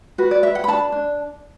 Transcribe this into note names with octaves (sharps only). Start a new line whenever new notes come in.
F#4 B4
D5
B4 E5
F#5
B5
D4 A5
D4